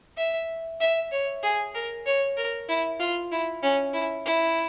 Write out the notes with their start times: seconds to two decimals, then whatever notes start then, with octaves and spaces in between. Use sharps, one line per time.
0.17 E5
0.81 E5
1.11 C#5
1.43 G#4
1.74 A#4
2.06 C#5
2.37 A#4
2.69 E4
3.00 F4
3.31 E4
3.63 C#4
3.93 E4
4.25 E4